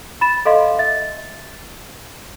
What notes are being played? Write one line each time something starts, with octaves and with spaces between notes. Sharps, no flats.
B5 A6 E7
A4 D#5 F5 C6
E5 A6